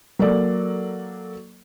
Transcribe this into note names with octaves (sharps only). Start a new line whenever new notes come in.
F#3 A#3 A4 D5